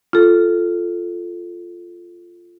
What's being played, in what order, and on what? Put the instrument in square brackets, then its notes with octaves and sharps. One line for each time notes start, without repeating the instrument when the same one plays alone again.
[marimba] F4 A4